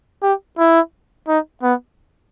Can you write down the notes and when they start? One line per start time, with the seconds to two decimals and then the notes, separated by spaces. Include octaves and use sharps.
0.22 G4
0.59 E4
1.28 D#4
1.63 B3